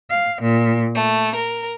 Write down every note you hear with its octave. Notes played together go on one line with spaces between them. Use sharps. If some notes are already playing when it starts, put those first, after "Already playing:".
F5
A#2
A3
A#4